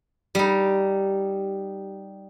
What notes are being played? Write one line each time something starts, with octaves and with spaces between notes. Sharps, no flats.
G3 D#4